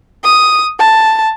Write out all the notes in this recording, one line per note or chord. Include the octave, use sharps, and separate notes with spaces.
D#6
A5